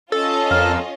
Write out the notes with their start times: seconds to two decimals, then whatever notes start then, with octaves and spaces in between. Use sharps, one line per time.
0.12 C#4 F4 A4 D#5
0.51 F2 A#4 F5